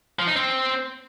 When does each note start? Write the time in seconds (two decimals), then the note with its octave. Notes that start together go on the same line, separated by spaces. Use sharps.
0.19 F3
0.27 D#4
0.36 C4